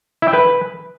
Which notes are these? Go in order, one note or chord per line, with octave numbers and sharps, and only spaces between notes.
E4
G5
B4